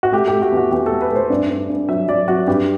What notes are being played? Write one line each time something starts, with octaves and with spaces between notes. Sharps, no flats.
F#4
A3 G4
A3 G4
F#4
E2
F#4
E2 G4
A3 A4
B4
A3 C5
G2 D5
G2
G2
F#3 E5
F#3 D5
F#3 F#4
G2 G4